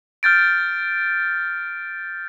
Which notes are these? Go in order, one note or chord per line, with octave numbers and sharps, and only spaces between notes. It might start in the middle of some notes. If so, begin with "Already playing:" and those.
F6 G6 A6 D7